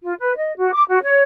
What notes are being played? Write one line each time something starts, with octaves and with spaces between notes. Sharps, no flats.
F4
B4
D#5
F#4
D6
F#4
C#5